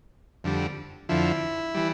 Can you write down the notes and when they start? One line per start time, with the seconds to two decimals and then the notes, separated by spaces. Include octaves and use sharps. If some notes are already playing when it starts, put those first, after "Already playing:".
0.44 F2 D3 G3
1.09 F2 D3 F3 E4
1.75 E3 G3